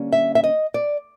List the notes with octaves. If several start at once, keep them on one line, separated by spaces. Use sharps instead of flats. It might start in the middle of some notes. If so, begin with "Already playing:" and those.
Already playing: D3 G3 A#3 C#4
E5
E5
D#5
D5